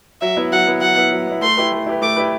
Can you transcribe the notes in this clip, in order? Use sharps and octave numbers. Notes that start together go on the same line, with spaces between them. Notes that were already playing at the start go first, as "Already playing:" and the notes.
F#3 E5
B3 E4
F#3 F#5
B3 E4
F#3 F#5
B3 E4
F#3
B3 E4
A3 C6
E4 G4 B4
A3
E4 G4 B4
A3 D6
E4 G4 B4